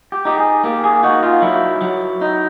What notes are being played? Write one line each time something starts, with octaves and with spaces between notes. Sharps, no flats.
G4
D#4 G4
G#4
A#3 G4
G#4
D#4 F#4
F4
F#3 E4
F#3
D#4